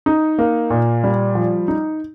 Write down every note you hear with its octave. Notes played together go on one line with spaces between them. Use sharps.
D#4
A#3
A#2
G3
F3
D#4